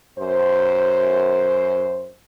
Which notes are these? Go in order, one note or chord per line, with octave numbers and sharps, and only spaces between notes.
F#2 C5